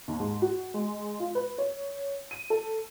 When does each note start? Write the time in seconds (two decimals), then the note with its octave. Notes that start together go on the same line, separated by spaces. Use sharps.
0.08 D#2
0.19 G#2
0.42 F#4
0.74 G#3
1.20 F4
1.35 B4
1.58 C#5
2.31 D#7
2.50 A4